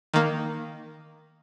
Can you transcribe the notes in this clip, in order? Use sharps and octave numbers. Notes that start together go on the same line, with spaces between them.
D#3 A#3